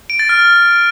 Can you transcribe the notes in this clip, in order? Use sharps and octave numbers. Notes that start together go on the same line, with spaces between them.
D7
A6
F6